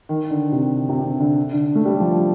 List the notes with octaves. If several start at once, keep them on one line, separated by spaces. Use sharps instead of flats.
D#3
D3
C3
C3
C3
D3
D3
D3
A3
G3
F3